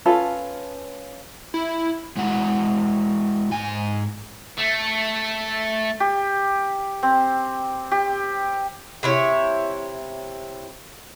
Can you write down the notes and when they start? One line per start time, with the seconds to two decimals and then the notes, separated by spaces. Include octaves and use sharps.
0.06 C#4 F4 A4 B4
1.54 E4
2.17 G#3 E4 F#4 F#5
3.52 G#2 G#5
4.58 A3
6.00 G4
7.03 C4
7.91 G4
9.03 C3 E4 C#5